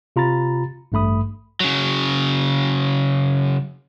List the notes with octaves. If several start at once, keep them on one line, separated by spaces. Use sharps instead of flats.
C3 F4 A#5 B5 A6
A1 G2 A3 B5 D#6
C#3 F#3